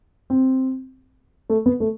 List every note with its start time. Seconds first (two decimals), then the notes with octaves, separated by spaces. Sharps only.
0.30 C4
1.50 A3
1.66 B3
1.80 A3